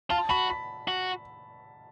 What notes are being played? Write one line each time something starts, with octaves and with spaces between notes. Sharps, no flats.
F4 A5
F#4 B5
B5
F#4